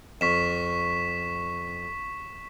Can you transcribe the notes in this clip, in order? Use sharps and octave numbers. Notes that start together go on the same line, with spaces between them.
F2 C#6 B6 E7